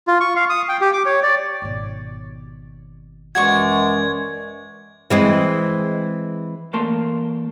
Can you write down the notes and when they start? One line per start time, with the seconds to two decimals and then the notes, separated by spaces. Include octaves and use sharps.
0.08 F4
0.20 C#6
0.36 F5
0.49 D#6
0.69 G5
0.81 G4
0.93 D6
1.06 C#5
1.23 D5
1.62 G#1 B2
3.35 F#2 E3 G#3 F#4 D5 C#6 G#6
5.10 E3 G#3 C4
6.73 E2 A3 A#3 A#4 A5 C6